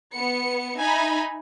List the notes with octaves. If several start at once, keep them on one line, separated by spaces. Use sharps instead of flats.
B3 C#7
D#4 E5 G#5 B5